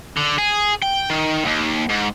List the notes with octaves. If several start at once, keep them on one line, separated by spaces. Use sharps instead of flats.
D3
G#4
G5
D#3
D#2
G#2